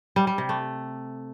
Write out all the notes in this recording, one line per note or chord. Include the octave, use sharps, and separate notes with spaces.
G3
G3
C3
A3